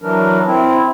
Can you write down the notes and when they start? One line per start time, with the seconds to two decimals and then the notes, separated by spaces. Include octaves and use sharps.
0.02 E3 F#3 D4 A#4
0.47 C4 E4